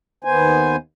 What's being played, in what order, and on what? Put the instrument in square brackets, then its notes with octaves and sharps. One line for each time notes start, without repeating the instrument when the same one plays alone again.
[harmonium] D#2 B3 C5 G#5